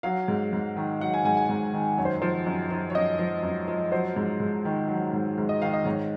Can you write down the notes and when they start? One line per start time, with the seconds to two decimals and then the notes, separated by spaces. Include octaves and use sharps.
0.03 F#3 F5
0.28 G#2
0.53 G#2
0.77 D#3
1.00 F#3 F#5
1.14 G#5
1.24 G#2 G#5
1.37 G#5
1.49 G#2
1.74 D#3
1.98 F#2 C#5
2.05 C5
2.22 F3 C5
2.46 F#2
2.71 F3
2.90 C#5
2.95 F#2 D#5
3.19 F3
3.43 F#2
3.68 F3
3.91 F#3 C5
4.16 G#2
4.40 G#2
4.65 D#3
4.88 F#3
5.13 G#2
5.38 G#2
5.49 D#5
5.62 D#3 F5
5.73 D#5
5.85 G#2 C#5